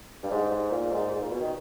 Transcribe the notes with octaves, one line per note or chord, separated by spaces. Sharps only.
G2
G#2
G#2
A#2
G#2
G#2
A#2
B2
D#3